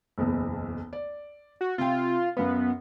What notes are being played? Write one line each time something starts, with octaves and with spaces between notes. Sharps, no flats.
F#1 B1 E2
D5
F#4
C3 F4 G5
F#2 B3 F5